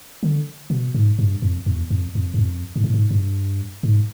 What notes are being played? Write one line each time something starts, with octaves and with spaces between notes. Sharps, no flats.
D3
B2
G#2
G2
F2
E2
F2
F2
F#2
F2
G#2
A2
G#2
G2
G#2